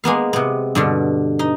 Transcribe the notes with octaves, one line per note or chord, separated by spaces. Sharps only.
G#3 A#3 B3 F5
C3 B3
G2 B2 D3
D#4